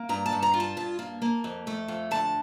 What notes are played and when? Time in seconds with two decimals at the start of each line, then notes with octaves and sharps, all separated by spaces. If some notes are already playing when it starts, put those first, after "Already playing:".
Already playing: A#3
0.09 G2 A#5
0.26 A5
0.32 G2
0.42 A#5
0.54 F4
0.60 A5
0.77 G2 A5
0.99 A#3
1.22 A#3
1.44 F2
1.67 A3
1.88 F2
2.11 D3 A5